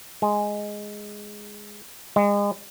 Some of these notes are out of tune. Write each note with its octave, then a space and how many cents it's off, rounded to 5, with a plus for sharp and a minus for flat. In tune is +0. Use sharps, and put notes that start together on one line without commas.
G#3 +0
G#3 -35